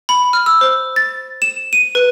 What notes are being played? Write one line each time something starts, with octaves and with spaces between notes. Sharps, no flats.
B5
F6
E6
C5
A6
E7
D#7
B4